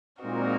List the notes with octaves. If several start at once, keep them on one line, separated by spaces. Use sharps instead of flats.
A#2 G#3 C4 D#4 F#4 A#4